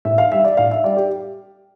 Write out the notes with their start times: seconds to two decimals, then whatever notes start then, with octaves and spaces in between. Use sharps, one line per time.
0.05 A2 E5
0.18 F5
0.32 G3 E5
0.44 D5
0.57 A2 F5
0.71 E5
0.84 G3 D5
0.96 G4